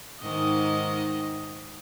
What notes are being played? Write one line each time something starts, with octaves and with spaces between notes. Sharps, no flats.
G#2 D#3 D#5